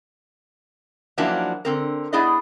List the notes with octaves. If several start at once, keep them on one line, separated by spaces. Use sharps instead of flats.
F3 F#3 A#3 C#4 D4 E4
D3 C4 A#4
B3 D4 E4 G#4 D5 D#5